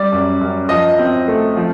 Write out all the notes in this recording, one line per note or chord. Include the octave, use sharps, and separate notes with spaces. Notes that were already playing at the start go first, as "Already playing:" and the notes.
Already playing: G3 D5
F#2
F#2
F3 D#5
C4
A3
F3